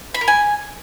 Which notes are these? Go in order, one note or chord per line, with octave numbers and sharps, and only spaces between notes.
B5
A#4
G#5